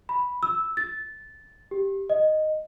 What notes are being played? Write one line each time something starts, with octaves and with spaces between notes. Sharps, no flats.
B5
E6
A6
G4
D#5